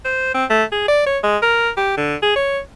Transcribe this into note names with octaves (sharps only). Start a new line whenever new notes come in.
C5
C4
A3
G#4
D5
C#5
G#3
A#4
G4
D3
G#4
C#5